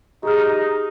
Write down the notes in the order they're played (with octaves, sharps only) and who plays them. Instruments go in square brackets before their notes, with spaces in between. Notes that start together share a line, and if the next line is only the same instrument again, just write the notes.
[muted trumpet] D#4 [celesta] G4 G#4 F6